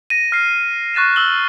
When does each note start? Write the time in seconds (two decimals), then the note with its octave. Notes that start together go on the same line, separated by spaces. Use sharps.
0.10 A#6 D#7
0.32 F6 C7
0.94 C#6 F#6 A6 D#7 E7
1.16 E6 F#7 G7